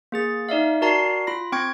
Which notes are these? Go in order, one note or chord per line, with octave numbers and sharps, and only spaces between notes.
A#3 G#4 A6
D#4 D5 E5 F5
F#4 A#4 D5 A5 A#5 C7
F4 B5 A#6
C4 G5 C#6 G#6